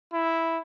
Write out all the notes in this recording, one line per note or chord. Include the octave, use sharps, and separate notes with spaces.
E4